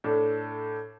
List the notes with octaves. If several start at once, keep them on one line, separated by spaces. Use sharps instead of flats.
A2 D4 A4